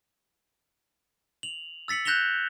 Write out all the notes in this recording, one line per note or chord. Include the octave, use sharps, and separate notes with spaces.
F7 F#7
E6 A6 B6 C#7 F#7
F#6 G6 A#6 E7 F7 G7